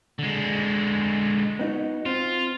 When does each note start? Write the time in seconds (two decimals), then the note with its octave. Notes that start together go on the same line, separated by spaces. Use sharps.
0.19 D3 G#3
1.59 B3 D#4 F#4
2.06 C4 F4